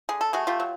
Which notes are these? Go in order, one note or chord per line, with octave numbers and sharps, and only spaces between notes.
D3 G#4
A4
A3 F#4 G#4
F4 G4
F#3